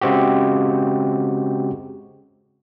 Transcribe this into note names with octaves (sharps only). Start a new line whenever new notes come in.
C#3 G#3 C4 F#4 G4